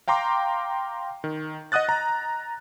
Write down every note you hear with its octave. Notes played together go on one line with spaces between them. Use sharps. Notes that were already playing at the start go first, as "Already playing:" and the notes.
F5 G5 A#5 C6 D6
D#3
D#5 F#5 D#6 F#6 A6
A#5